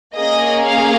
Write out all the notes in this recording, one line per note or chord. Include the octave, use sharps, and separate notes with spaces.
A#3 C#4 G#4 D#5
F5